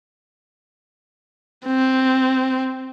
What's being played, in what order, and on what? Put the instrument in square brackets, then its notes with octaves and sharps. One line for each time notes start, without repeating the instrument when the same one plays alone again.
[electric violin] C4